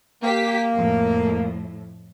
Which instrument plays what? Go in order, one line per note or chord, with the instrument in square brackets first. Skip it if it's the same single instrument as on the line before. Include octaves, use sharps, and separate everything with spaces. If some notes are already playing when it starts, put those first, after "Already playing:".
[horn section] A#3 [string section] G4 B6
[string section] F2 A2